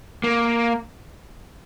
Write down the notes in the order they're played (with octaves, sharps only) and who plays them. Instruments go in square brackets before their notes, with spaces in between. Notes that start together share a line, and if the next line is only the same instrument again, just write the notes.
[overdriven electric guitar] A#3